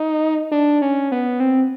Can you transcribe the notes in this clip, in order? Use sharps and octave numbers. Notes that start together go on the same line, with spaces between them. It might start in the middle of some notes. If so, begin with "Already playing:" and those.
Already playing: D#4
D4
C#4
B3
C4